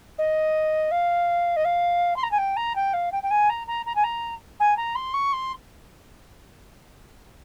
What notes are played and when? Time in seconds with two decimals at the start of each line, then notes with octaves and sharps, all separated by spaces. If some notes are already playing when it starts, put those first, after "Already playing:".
0.19 D#5
0.91 F5
1.57 D#5
1.65 F5
2.17 C6
2.23 A#5
2.31 G#5
2.38 G5
2.57 A#5
2.76 G5
2.94 F5
3.12 G5
3.23 G5
3.31 G#5
3.50 A#5
3.68 A#5
3.86 A#5
3.96 G#5
4.04 A#5
4.60 G#5
4.77 A#5
4.95 C6
5.14 C#6
5.33 C6